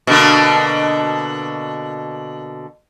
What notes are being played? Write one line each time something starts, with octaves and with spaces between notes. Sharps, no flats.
B2 D3 A#3